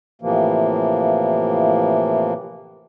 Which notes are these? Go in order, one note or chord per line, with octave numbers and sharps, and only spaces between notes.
A2 C3 E3 F3 A#3